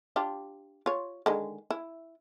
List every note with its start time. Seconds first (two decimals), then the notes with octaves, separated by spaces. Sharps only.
0.16 D4 F4 G4
0.86 F4 C#5
1.26 D3 D#3 G#3
1.70 E4